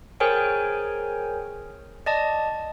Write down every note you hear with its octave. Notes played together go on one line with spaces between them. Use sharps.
G#4 A#4 C5 C#5 G5 G#5
D5 D#5 A5